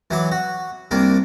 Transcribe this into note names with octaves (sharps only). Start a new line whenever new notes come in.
E3 F#3 D6
F#4
C2 A#3 D4